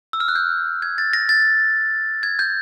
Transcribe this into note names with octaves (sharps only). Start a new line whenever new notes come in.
E6
F6
F#6
G6
G#6
A6
A#6
A6
G#6
G6